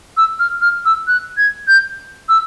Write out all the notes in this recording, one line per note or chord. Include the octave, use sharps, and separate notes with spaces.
E6
F6
F6
E6
F#6
G#6
G6
E6